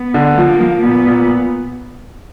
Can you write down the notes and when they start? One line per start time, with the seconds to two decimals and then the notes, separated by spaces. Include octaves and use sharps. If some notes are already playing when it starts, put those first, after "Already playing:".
Already playing: B3
0.14 D3
0.37 F3 A#3
0.61 F3
0.83 A#2 B3
1.07 A#2